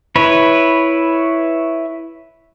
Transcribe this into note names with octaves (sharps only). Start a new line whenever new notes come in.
E4 B4 C#5